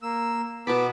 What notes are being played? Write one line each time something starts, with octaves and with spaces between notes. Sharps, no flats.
A#3 E6
B2 B3 A5 B5 D6